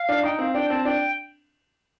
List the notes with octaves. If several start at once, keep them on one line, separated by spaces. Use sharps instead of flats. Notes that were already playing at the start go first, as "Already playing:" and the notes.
Already playing: F5
D4
D#4 G5
C4 F5
D4 G5
C4 A5
D4 G5